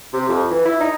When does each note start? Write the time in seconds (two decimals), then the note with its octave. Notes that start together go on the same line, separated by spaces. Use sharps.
0.13 C3
0.29 F2
0.51 E3
0.65 E4
0.80 D#4